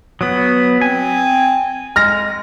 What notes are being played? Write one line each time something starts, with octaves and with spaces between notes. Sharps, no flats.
F#3 B3 D#6
C4 G#5
G#3 F6 A#6